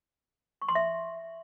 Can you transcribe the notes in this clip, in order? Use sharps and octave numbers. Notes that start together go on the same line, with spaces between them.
C#6
C6
E5